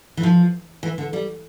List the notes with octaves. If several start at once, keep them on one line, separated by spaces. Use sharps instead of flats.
E3
F3
E3
D3
G3